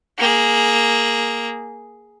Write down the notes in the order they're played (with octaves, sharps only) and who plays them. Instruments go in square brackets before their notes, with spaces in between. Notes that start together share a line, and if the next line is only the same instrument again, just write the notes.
[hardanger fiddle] A#3 G#4